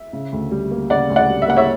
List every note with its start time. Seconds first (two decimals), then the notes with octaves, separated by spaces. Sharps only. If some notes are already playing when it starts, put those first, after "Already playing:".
Already playing: E5
0.13 C#3
0.33 D2
0.51 G3
0.71 A#3
0.90 C#3 D5 F#5
1.10 D2
1.16 D5 F#5
1.29 G3
1.42 E5
1.48 A#3 F#5
1.57 C#5 E5